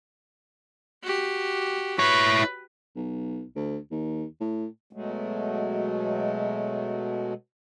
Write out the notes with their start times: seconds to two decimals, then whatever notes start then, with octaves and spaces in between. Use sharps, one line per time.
1.03 F#4 G4
1.99 E4 B4 C#5
2.96 B1
3.56 D2
3.91 D#2
4.41 A2
4.93 B2 F#3 G#3 A3